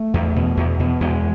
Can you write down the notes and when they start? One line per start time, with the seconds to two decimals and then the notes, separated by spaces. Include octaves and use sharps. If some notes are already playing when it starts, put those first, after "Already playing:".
Already playing: A3
0.14 E2
0.36 B2
0.57 E2
0.80 B2
1.00 E2 G#3